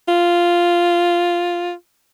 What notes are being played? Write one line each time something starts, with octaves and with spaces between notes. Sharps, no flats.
F4